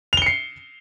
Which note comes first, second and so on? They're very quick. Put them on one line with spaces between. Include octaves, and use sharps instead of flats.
F7 G7 C#7 C7